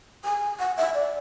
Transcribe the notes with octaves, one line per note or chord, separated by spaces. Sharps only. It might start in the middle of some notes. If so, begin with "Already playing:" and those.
G#5
F#5
E5
D5